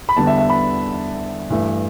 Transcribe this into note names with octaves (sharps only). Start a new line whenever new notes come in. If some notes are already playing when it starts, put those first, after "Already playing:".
B5
E2 D3 G3 B3 A5
E5
E5
B5
G2 E3 A3